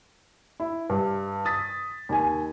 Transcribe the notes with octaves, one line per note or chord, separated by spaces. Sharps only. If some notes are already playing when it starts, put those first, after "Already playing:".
E4
G2
D#6 A6 B6
D#2 G#5